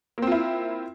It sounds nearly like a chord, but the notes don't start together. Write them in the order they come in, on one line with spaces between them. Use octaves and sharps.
A#3 C4 F4 E4